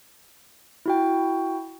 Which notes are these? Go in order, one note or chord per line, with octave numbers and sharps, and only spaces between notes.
E4 F#4 G5